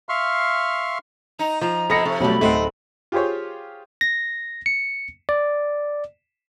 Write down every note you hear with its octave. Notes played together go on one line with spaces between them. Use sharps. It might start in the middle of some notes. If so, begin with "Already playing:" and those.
E5 F5 C6 C#6 F6
D#4 A#5
F3 A#5
B2 C4 A4 D#5 F5 B5 A#6 C#7
C3 A4
B2 F#3 G3 A3 C#4 B5
D1 A3 C4 D#4 F#5
F4 G4 G#4 C5 C#5
A#6
C#7
D5